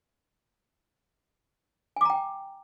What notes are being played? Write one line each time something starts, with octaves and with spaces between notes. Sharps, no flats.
G5 G#5 A#5 D6